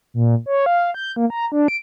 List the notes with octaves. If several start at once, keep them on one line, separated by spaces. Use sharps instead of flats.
A#2
C#5
F5
G6
A#3
A#5
D4
D7